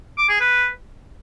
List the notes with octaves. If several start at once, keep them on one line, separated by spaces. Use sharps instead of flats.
D6
G#4
B4